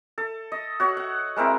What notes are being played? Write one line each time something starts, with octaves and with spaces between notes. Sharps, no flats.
A4
D#5
F#4 C#5 F#5
F#5
G#3 A#3 C4 E4